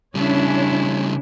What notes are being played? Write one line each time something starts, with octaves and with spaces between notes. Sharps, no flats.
C#3 G3 C#4 D4 E4